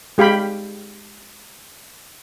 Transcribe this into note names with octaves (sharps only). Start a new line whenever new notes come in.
G#3 G4 F5 G5 B5